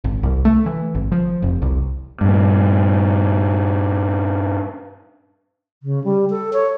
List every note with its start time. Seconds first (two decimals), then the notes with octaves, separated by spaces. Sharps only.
0.04 G#1
0.23 C2
0.45 A3
0.66 E3
0.95 G#1
1.12 F3
1.42 F1
1.62 C2
2.21 G2 A#2
5.83 C#3
6.04 G3
6.30 A4
6.53 C#5